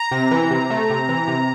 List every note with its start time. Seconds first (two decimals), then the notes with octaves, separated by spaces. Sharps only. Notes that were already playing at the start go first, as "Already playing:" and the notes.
Already playing: A#5
0.11 C3
0.31 E3
0.51 C3
0.70 A3
0.90 C3
1.09 E3
1.28 C3